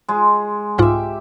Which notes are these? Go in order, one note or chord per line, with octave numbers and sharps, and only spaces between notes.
G#3
C2 G#2 F4 G4 E5